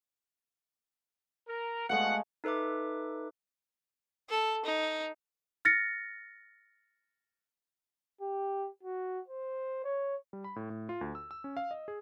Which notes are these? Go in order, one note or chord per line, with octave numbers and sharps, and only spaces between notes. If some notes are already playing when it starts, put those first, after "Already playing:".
A#4
B2 G#3 A3 F5 F#5
D#4 A4 B4 E5 D6
A4
D#4
F6 A6 A#6 C#7
G4
F#4
C5
C#5
G3
B5
A2
A2
F4
D2
E6
E6
C#4
F5
D#5
G#4